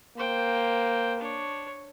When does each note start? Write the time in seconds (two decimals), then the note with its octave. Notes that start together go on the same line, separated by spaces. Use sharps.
0.18 A#3 C5 G5
1.20 D4 C#5